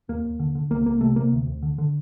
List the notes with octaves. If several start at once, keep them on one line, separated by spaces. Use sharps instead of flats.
D#2 A#3
D#2
D3
D3
C2 A#3
C2 A#3
C3 A3
C3 A#3
D2
D2
D3
D3